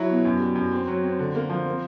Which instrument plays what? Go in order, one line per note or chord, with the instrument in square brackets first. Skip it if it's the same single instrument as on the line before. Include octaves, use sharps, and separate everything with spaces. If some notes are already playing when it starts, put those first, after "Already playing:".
Already playing: [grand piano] F#3 E4
B2
F#2
G3
F#2
C4
F#3
C4
D3
A#3
F3
C4